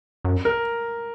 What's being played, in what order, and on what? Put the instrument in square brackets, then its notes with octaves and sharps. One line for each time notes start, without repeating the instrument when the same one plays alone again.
[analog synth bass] F#2
[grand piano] A#4